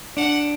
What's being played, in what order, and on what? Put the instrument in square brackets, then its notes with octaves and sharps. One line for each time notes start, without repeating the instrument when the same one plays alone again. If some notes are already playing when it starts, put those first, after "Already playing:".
[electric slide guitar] D4 [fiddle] F#5